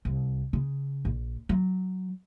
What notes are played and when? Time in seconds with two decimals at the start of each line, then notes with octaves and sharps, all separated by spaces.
0.05 C2
0.53 C#3
1.05 A#1
1.49 F#3